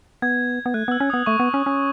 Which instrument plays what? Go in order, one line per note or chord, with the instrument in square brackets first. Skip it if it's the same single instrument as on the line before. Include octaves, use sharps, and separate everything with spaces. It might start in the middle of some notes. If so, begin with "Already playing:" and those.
[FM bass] B3 [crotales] G#6
[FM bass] B3
[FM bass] A3 [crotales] F#6
[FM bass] B3 [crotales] E6
[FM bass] C#4
[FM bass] B3 [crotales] D#6
[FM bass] A3 [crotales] C#6
[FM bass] B3
C#4
C#4